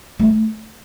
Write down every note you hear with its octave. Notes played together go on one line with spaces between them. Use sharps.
A3